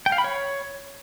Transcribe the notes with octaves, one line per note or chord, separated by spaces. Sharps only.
G5
F5
B5
C#5